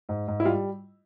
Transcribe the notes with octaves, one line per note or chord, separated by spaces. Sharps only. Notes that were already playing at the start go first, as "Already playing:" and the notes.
G#2
G#2
E4
G3 F4